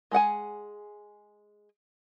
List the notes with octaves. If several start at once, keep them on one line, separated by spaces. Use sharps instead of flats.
G#3 G#4 F#5 G#5